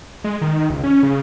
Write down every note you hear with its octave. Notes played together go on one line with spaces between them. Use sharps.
G#3
D#3
C#2
C#4
C#3